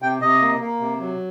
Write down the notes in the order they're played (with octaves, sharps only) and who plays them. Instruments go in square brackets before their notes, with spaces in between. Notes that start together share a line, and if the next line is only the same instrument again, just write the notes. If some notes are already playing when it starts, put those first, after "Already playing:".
[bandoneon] C3 G5
C3 D#5
A#3
A#3
C3
F#3